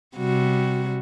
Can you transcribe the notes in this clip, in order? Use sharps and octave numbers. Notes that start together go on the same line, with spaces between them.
C3 G3 F#4